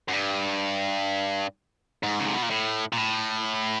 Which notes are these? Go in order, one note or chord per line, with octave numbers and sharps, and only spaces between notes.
F#2
G2
G#2
C#3
C3
B2
A#2
A2
A#2
A2